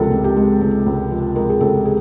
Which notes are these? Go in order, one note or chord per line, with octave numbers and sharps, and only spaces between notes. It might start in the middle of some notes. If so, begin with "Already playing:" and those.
Already playing: C#2 C3 F3 G#3 A4 A#4
C#2
G4
G#3
C#2
C#2
F3
G#3 A#4
G#4
C#2 A4
G#4